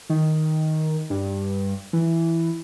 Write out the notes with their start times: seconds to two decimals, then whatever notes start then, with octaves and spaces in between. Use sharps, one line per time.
0.10 D#3
1.10 G2
1.93 E3